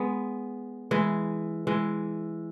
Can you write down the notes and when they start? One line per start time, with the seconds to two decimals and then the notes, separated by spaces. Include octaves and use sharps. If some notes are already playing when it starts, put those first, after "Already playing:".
Already playing: G#3 B3
0.91 E3 G#3
1.67 E3 G#3